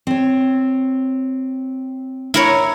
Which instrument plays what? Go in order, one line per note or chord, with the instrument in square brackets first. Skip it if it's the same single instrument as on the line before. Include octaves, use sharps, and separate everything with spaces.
[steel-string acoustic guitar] C4 C#5
[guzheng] E4 A#4 C#5